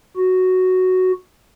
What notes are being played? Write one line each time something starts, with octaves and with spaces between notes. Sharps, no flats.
F#4